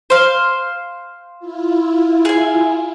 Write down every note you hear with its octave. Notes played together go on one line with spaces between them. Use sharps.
C5 F5
E4 F4
G#4 G#5